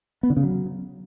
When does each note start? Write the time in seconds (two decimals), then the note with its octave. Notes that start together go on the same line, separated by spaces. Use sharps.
0.23 B3
0.30 D3
0.37 C#3
0.43 F#3